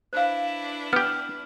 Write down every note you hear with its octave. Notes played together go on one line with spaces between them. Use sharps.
D4 E4 B4 C5 F5
B3 G4 F6